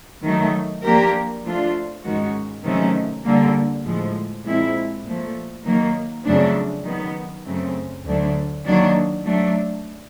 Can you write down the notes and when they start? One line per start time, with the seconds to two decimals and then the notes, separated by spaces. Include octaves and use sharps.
0.23 D#3 F#3 A3
0.84 F3 A#3 D4 G4 A#4
1.43 F3 A3 D4 F4
2.04 G#2 D#3 G#3 C#4 F#4
2.63 C3 D#3 F#3 A3 C#4
3.24 D3 G3 A#3
3.84 A2 F3 G#3
4.44 A#2 F3 G#3 C4 E4
5.05 A#2 F3 A3
5.65 D#3 F#3 A#3
6.25 F2 C#3 F#3 A3 D4
6.84 D#3 F#3 B3
7.44 F#2 C#3 F#3 A3 C4
8.05 D2 D3 F#3 A3 D4
8.65 D#3 F#3 A#3 D4
9.25 F#3 A3 D4